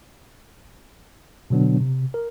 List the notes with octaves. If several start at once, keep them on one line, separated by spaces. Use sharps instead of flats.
B2 D3 F#3 B3 D4
C3
A#4